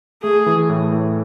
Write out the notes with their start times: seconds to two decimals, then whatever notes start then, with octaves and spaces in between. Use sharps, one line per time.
0.23 A3 G#4
0.46 E3
0.70 A2
0.92 A2